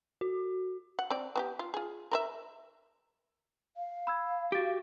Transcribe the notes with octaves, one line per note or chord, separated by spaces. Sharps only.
F#4
F#5
C4 D5
B3 F#4 G4
F4
F4 G#4
A#4 B4 E5
F5
B5 E6 G#6
F#4 G4 A6 D7